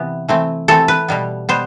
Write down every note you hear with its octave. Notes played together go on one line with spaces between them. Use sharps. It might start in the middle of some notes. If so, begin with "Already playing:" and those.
Already playing: C3 E3 B3
E3 A3 C4
E3 A3 C4 A4
B4
B2 G3 B3
B2 G3 B3 C5